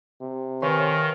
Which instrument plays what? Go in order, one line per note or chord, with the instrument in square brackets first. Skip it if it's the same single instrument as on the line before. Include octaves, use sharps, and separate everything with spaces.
[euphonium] C3
[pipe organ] D#3 [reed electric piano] B4 G#5 C6 [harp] C#5 F5 C#6